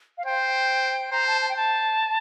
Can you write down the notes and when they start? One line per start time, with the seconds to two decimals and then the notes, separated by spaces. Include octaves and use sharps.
0.18 F5
0.25 C5 G5
1.12 C5 A#5
1.27 A5
1.41 A5
1.49 G5
1.56 A5